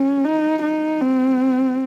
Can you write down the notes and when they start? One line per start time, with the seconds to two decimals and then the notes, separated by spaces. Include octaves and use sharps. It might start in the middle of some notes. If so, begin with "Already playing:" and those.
Already playing: C#4
0.24 D#4
0.62 D#4
1.01 C4